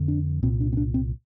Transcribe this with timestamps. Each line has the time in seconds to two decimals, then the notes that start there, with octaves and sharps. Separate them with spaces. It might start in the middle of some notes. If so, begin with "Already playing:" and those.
Already playing: F2 D3
0.08 D4
0.43 C2 A#2 C4
0.61 D4
0.73 C4
0.77 D4
0.94 C4